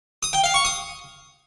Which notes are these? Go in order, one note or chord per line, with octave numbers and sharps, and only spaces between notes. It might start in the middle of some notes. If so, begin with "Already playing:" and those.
D#6
G5
F5
C#6
D#6